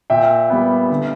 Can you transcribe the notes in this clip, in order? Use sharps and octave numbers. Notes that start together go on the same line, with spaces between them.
A#2 E5 G5
G3 B3
D3